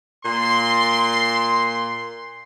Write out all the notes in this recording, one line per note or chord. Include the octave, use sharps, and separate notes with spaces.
A#2 C6